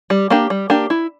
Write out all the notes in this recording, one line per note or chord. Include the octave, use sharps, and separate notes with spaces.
G3
A#3 D4 G4
G3
A#3 D4 G4
E4